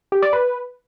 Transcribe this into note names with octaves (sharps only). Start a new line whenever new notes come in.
G4
D5
B4